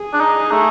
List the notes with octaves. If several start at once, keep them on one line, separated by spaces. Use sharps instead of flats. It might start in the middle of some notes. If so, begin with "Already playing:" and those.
Already playing: G#4
D4
D#4
A3